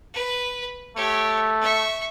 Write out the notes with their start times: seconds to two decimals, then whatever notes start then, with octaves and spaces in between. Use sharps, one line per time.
0.14 B4
0.96 A3 G4 C#5
1.61 E5 C#6